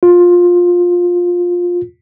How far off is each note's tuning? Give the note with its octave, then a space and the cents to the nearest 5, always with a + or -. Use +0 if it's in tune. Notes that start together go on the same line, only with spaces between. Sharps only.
F4 +15